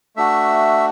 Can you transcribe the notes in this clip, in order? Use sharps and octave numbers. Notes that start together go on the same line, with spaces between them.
A3 D4 F#4 E5